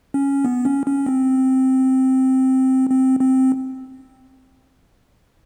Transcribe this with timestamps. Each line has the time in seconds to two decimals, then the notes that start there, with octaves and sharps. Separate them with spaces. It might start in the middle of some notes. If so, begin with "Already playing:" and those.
0.14 C#4
0.45 B3
0.65 C#4
0.86 C#4
1.06 C4
2.90 C4
3.20 C4